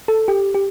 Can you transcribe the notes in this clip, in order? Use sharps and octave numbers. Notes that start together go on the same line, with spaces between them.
A4
G4
G4